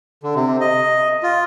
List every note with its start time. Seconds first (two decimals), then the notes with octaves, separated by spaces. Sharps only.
0.23 D3
0.35 C3
0.61 D#5
1.23 F4